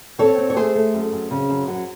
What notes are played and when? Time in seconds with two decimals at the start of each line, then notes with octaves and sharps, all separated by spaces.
0.19 C4 A4 C#5
0.38 C4
0.50 C#5
0.56 A3 G#4 C5
0.75 A3
0.94 F#2
1.13 F#2
1.31 C#3
1.49 F#2
1.68 F#3